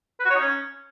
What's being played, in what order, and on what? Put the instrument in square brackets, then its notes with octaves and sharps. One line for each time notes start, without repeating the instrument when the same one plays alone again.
[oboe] B4
F#4
C#5
D#4
C#4